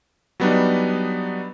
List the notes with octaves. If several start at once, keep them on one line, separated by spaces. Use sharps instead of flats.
F#3 G3 B3 D4 D#4